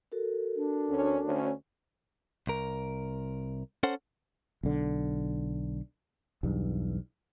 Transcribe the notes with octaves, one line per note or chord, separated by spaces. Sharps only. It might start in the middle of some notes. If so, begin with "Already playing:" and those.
F#4 A4 A#4
D4
D2 C#4
D2 C#4
C2 A#4
C#4 A4 C5 F#5
B1 D3
B1 E2 G2